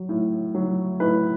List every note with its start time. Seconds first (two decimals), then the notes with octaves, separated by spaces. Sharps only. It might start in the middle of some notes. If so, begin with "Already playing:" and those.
Already playing: F#3
0.09 A2
0.55 F#3
1.00 A2 B4